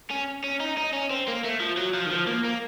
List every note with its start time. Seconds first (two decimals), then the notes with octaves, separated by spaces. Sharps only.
0.11 C#4
0.44 C#4
0.60 D#4
0.78 D#4
0.93 C#4
1.11 C4
1.28 A#3
1.44 A3
1.60 F3
1.77 F#3
1.94 F3
2.06 D#3
2.11 F3
2.27 A#3
2.45 A#3